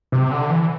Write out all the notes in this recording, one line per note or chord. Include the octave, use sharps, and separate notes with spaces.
C3
D3
E3